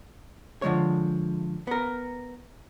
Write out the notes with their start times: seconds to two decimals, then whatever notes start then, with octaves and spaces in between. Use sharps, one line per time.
0.62 D3 F3 G#3 C#5
1.67 B3 A#4